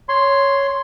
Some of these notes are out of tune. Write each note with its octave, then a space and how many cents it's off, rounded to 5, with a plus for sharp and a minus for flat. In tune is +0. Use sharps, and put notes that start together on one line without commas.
C#5 +0 C6 +0